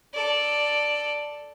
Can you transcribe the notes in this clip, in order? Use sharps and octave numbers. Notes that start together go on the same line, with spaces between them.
A4 D5